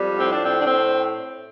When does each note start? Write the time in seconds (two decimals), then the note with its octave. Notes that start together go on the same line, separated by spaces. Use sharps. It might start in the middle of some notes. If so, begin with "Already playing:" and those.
Already playing: F2 G3
0.17 A2 C4
0.31 D4
0.44 C4
0.49 A2
0.60 D4
0.65 C4